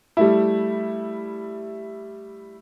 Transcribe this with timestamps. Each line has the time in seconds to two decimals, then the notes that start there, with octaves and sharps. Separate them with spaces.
0.17 G3 A3 E4